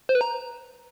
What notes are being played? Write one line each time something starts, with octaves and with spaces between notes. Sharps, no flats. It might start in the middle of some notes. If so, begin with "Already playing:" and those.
C5
B4
A#5